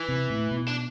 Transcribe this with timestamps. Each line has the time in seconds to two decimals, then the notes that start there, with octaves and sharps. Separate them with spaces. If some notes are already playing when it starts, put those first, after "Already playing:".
Already playing: E3
0.09 C3
0.30 A2
0.51 B2
0.68 D4